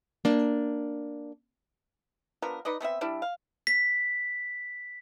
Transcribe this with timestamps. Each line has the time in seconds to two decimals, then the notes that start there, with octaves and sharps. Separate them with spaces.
0.25 A#3 D4
2.42 F3 B3 D4 A#4
2.65 D#4 B4 D5 D#5
2.81 A3 B3 C4 E5
3.01 G3 D4 E4
3.22 F5
3.67 B6